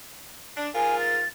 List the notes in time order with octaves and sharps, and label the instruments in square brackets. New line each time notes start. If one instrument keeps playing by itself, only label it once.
[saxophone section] D4
[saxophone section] G#2 F4 A#4 [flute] G#5
[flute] A6